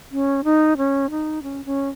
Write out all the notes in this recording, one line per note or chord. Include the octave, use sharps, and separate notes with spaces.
C#4
D#4
C#4
D#4
C#4
C#4